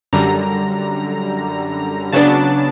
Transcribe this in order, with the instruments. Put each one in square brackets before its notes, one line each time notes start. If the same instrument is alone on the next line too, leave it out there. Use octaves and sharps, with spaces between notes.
[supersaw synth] F#2 D3 G3 A#5
C#3 F#3 B3 D4 A5